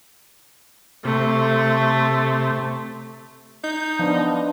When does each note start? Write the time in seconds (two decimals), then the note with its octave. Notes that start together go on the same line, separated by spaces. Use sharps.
1.05 C3 A3
3.64 D#4 G6
3.99 F3 B3 D4